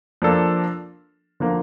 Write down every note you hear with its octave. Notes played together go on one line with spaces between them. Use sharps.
F3 A#3 D4 A4
D3 F3 A#3